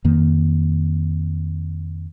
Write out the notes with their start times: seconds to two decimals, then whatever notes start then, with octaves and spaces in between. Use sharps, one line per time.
0.05 F2 D#3 A#3